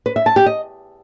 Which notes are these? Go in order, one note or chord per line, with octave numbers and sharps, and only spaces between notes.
B4
E5
A5
G4
D#5